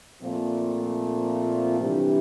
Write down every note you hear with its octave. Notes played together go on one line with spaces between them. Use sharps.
A#2 F3 A3 C4 F4
C3 E3 G3 D4 G4